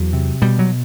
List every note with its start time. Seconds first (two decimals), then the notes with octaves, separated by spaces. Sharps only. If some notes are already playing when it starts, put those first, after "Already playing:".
Already playing: E2 F#3
0.13 C3
0.42 B2 G3
0.59 F#3